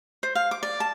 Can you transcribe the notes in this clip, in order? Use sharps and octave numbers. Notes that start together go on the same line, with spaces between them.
C5
F5
D6
D5
A5